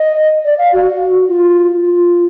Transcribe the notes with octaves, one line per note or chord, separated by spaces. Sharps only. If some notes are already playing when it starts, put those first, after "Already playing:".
Already playing: D#5
D5
F5
F#4
F4
F4